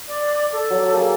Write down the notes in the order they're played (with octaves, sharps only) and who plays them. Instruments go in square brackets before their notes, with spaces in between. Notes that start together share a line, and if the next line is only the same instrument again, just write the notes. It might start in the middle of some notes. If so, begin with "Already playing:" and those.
[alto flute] D5
A4
[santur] F#3 D5
A#3 G#4